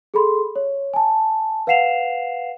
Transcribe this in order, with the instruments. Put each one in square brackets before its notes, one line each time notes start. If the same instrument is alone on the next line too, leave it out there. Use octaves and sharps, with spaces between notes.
[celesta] G#4 A4 B5 C6
C#5
G#5 A5
B4 F5 F#5 C7 E7 F7